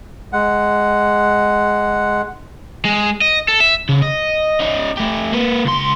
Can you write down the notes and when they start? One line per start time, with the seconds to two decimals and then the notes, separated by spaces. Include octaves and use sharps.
0.33 G#3 F#5
2.85 G#3
3.22 D#5
3.48 A4
3.60 E5
3.89 C#3
4.02 D#5
4.60 C#4 D#4
4.97 A3 G4
5.33 A#3 B4
5.65 C#2 C6